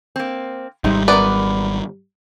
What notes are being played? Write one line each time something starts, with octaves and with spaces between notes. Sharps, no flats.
A#3 C4
G#1 C3 G3 C4 D#4
F#2 B3 A#4 B4 D5